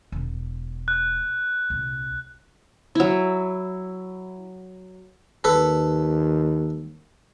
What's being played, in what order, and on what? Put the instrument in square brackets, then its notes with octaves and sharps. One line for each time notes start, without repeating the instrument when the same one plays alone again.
[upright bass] E1
[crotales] F#6
[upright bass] C2 A#2
[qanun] F#3 E4
[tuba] D#2 [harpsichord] A4 B4